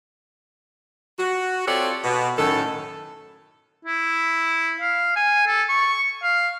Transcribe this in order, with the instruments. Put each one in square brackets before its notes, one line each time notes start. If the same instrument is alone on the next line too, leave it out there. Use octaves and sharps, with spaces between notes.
[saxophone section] F#4
C4 F4 G4 A4 C#5 D5
B2
F#2 A2 D#3 A4
[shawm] E4
F5
G#5
A4
C#6
F5